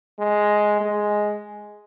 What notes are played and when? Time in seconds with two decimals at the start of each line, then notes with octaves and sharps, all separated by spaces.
0.19 G#3
0.81 G#3